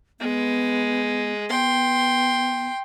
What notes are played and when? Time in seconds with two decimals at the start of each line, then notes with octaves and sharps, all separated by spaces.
0.20 G#3 B3
1.49 B3 G5 C6